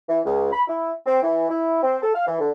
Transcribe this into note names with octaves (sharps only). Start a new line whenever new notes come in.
E3
C#2
B5
E4
C4
E3
E4
C4
A4
F5
E3
D3